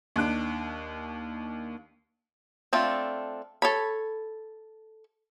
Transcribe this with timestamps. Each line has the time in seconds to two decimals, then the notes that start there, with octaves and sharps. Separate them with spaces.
0.16 D#2 D4 F#6 D7
2.73 A3 C4 D4 F4
3.62 A4 C#5 B5